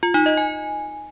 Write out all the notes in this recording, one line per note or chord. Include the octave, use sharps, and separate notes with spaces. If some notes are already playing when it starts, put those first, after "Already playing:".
F4
D#4
D#5
G#5